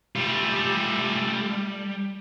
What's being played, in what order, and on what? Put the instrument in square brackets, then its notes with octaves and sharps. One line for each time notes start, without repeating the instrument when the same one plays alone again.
[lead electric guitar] G3 [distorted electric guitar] A3 F4